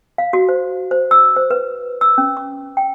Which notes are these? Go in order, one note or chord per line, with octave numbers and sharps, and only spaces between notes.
F5
F#4
C5
C5
E6
C5
B4
E6
C#4
D6
G5